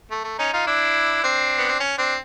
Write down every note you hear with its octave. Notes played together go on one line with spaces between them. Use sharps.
A3
A3
C#4 D#4
D#4 F4
D4 E4
C4 D4
B3
C4
C#4
C4 D4